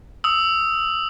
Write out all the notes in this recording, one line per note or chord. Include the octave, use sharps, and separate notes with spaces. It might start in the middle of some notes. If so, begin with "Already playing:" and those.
D#6 E6